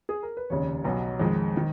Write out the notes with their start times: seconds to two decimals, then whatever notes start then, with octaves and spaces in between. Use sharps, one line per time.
0.09 G#4
0.23 A#4
0.37 B4
0.50 F1 D#2 C#3 C#5
0.84 B1 B2 F#3
1.19 F2 D#3 G#3
1.57 D#3